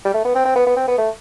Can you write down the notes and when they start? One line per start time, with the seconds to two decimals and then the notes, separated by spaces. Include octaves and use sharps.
0.05 G3
0.14 A3
0.25 B3
0.35 C4
0.45 C4
0.55 B3
0.66 B3
0.77 C4
0.87 B3
0.98 A3